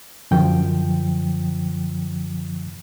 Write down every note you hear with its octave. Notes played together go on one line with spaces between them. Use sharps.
F#2 D3 F3 G5